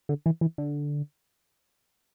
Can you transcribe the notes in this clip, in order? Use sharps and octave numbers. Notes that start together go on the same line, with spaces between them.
D3
E3
E3
D3